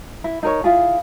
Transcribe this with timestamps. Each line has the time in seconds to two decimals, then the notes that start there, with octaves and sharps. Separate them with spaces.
0.24 E4
0.43 D#4 A#4 C#5
0.64 E4 F4 G#4